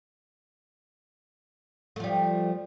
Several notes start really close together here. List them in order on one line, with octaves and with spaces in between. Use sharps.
A3 F3 G3